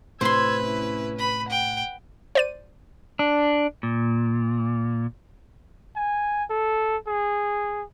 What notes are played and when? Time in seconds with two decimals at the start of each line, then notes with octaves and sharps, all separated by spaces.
0.21 A2 C3 B4 C5 C6 E6 G#6
0.61 C#4 E4
1.18 B4 B5
1.49 F#5 G5
2.35 C5 D5 D#7
3.19 D4
3.83 A#2
5.96 G#5
6.50 A4
7.07 G#4